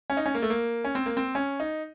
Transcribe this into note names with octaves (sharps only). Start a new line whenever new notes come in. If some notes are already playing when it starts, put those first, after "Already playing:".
C#4
D#4
C#4
A#3
A3
A#3
C#4
C4
A#3
C4
C#4
D#4